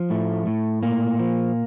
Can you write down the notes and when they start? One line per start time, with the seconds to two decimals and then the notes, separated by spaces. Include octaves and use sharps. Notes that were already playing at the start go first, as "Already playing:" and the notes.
Already playing: F3
0.10 A2 A3
0.47 A2
0.83 A#2 A#3
1.19 F3